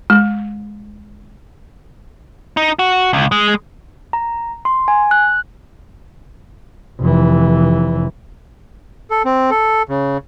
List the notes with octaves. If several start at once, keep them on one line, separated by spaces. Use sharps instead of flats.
G#3
D#4
F#4
C#2
G#3
A#5
C6
G#5
F#6
F1 E3
A4
C4
A4
C#3